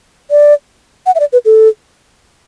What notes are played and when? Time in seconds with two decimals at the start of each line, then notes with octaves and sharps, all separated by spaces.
0.31 D5
1.06 F#5
1.15 E5
1.20 D5
1.33 B4
1.45 A4